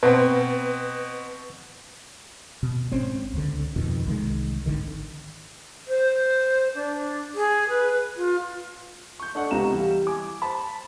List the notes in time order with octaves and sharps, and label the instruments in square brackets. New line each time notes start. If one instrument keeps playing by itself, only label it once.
[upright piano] B2 C4 [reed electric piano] B4
[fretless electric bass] B2
G#1 C4 C#4
C#2 D3
F2 B2 D#3
C2 D#3 G#3
G#1 D3 D#3
[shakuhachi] C5
D4
G#4
B4
F4
[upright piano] C#6 G6
D4 A4 D5 D#5 F#5 C#6
C#2 C3 B3 F5 A#5 E7
E3 G3
G#5 D6
C5 A5 B5